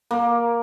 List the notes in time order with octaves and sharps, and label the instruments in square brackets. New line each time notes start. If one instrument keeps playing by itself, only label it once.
[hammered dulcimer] A#3